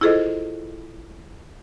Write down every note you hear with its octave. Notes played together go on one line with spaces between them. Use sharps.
E4 F4 G#4 A4 C5 D#5